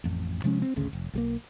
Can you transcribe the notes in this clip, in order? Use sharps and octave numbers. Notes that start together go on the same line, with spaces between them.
A1 F2
C3 F3 G#3 C#4
C4
G#1 D2 C#3
F1
B1 G3 A#3